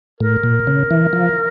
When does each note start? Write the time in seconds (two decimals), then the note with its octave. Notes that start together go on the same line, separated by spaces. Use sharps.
0.20 A2 A#4
0.43 A#2
0.67 C#3
0.91 E3
1.13 F3